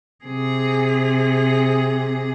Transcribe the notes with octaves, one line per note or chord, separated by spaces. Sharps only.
C3 G#4